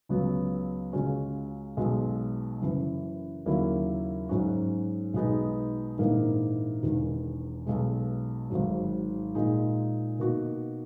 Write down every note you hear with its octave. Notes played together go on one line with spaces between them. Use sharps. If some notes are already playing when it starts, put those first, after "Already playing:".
C#2 C#3 F#3 B3
C#2 C#3 G#3 C#4 F#4
B1 B2 G#3
F#1 F#2 E3
D#2 C#3 F#3 A#3 E4
G#2 F#3 C#4 F#4
B1 B2 G#3 B3 D#4
A#1 G#2 E3 A#3 D#4
E1 E2 D#3
B1 B2 G#3
G#1 G#2 F#3
A#2 G#3 D#4
B2 A#3 D#4 F#4